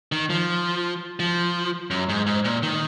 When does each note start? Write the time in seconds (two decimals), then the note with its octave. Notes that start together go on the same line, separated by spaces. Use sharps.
0.12 D#3
0.30 F3
1.20 F3
1.90 F#2
2.09 G#2
2.26 G#2
2.45 A#2
2.63 D#3